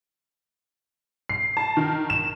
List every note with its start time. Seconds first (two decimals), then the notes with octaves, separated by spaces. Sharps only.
1.29 C7
1.57 A5
1.77 D#3
2.10 E7